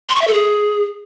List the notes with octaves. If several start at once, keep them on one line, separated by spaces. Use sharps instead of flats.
C6
C#6
E5
A4
G#4